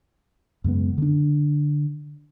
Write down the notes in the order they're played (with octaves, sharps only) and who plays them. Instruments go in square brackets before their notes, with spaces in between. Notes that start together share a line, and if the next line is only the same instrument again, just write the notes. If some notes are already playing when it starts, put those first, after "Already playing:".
[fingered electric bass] F#2 C#3 G#3 B3
D3 D4